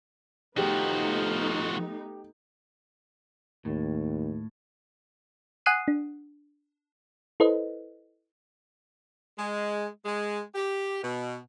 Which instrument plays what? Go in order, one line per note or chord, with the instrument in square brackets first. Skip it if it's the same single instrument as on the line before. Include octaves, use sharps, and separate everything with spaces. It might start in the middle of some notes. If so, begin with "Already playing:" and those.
[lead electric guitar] F3 F#4 [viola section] A3 B3 D#4 [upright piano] G4
[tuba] D#2 [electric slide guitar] A2
[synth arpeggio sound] F#5 G#5 D#6 F#6 C7 D#7
D4
E4 A4 B4 C5 D#5
[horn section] G#3
G#3
G4
B2